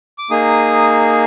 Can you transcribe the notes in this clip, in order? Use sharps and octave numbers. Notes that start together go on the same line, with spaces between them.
D6
A#3 D#4 G#4 D#6